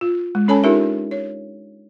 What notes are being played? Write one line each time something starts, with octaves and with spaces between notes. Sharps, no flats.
F4
G#3
C#4 A4 C#5 G#5 A5 B5
D4 D#4 F4 G4 A#4 E5
C#5